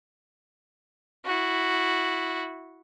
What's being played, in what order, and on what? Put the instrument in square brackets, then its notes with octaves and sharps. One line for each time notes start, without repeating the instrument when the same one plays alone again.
[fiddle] E4 F#4